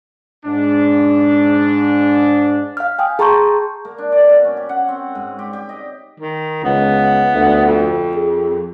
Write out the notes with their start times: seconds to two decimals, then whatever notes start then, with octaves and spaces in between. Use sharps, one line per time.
0.46 G#2 D4
2.77 F5 F6
2.99 G5 G#5 D#6
3.19 G#4 A5 A#5 C6 C#6 G6
3.85 A#3
3.98 D4
4.12 D5
4.29 B2
4.44 C#4
4.57 G4
4.69 F#5
4.88 C4
5.15 G#2
5.39 G4
5.53 G4
5.69 D#5
6.20 D#3
6.64 C#2 B3
7.34 D2
7.66 F2
8.16 G#4